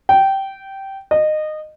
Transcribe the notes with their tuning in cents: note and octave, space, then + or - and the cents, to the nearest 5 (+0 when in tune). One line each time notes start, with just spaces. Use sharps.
G5 -15
D#5 -20